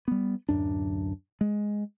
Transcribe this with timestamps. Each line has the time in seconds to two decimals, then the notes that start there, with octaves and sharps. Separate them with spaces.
0.08 G3 B3
0.49 D1 G#1 F#2 D4
1.41 G#3